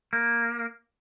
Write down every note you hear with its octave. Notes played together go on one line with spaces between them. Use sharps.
A#3